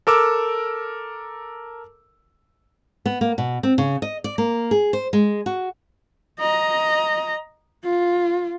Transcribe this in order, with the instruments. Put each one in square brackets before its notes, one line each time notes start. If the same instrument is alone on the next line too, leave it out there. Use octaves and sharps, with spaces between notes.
[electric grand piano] A4 A#4 D6 E6
[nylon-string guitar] B3
A#3
B2
C4
C#3
D#5
D5
A#3
G#4
C5
G#3
F#4
[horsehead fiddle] D#5 A#5
F4